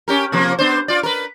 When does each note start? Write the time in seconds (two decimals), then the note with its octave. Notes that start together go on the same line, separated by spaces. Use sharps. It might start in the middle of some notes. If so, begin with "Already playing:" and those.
0.08 C#4 G4 A#4
0.32 C3 F3 A#3
0.59 B3 D4 C5
0.88 F4 D5
1.03 A#4 B4